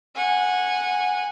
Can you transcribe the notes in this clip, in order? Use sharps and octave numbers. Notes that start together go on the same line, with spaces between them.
F#5 G#5